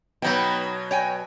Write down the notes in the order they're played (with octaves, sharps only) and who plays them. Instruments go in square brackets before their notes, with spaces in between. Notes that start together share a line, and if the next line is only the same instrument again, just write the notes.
[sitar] B2 F#3 [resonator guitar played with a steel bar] B3 D#4 G5
[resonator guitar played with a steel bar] C#5 G5 G#5